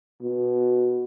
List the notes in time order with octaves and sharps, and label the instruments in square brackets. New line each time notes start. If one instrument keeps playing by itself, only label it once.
[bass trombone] B2